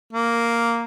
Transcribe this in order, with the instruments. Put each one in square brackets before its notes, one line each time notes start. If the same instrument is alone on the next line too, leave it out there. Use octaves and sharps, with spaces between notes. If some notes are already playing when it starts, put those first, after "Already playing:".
[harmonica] A#3